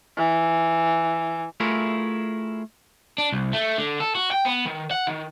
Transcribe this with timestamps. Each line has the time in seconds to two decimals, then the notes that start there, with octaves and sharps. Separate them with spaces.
0.17 E3
1.60 A3 E4 F4 G#4 A#4
3.18 D4
3.32 C2
3.53 A3
3.78 D3
4.00 A4
4.15 F#4
4.32 G5
4.45 B3
4.65 D#3
4.91 F#5
5.07 D#3